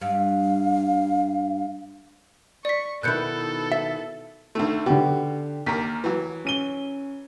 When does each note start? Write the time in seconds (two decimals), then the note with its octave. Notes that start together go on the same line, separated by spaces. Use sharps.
0.01 G2 F5
2.65 D5 C#6 B6
3.03 B2 D#3 E4 A4 F#6 G6 C#7
3.72 E5
4.55 D2 D#3 A3
4.86 B2 D3 G4
5.66 D#2 A#4 B6
6.04 E3 F#3
6.45 C#4 D#7 G7